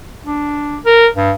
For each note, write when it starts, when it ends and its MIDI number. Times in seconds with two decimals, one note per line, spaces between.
0.24 0.78 62
0.86 1.08 70
1.16 1.32 43